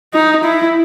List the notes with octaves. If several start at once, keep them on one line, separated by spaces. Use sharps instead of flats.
D#4
E4